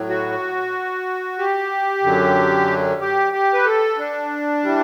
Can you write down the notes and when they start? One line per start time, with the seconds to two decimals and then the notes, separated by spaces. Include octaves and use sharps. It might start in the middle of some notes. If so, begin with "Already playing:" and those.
Already playing: A2 F#3
0.09 F#4
1.39 G4
2.03 F#2 D3 F#3
3.01 G4
3.33 G4
3.54 B4
3.65 A4
3.98 D4
4.63 E3 G3